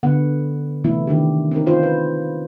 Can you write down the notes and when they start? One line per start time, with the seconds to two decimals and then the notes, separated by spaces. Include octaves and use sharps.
0.03 D3 B3 F#5
0.84 C3 E3 A3 B3 E4
1.07 D#3 D4 G4
1.51 C4 C#4 D#4 A#4
1.66 D#4 F4 C5
1.83 B4